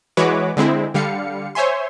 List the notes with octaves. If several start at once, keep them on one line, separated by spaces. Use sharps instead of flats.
E3 G#3 F#4 B4 C#5 D6
D3 G#3 C4 E4
D3 G3 F5 C#7
C5 C#5 E5 G#5 C6